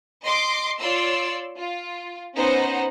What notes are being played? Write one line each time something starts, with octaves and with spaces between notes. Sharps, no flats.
D#5 C6 D6
F4 C#5 D5 C6 E6
F4
B3 C#4 D#4 C5 F#5